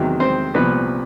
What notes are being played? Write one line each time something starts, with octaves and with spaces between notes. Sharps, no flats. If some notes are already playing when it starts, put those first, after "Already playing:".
Already playing: E2 C3 D#3 F#3
C4 C5
C2 A#2 F3 B3 B4